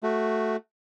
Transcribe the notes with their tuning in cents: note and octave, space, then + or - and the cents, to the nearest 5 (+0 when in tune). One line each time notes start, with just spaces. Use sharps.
A3 +0 F#4 +0